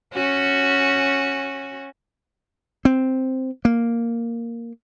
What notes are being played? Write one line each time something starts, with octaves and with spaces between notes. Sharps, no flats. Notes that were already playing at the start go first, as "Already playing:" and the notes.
C#4 F#4
C4
A#3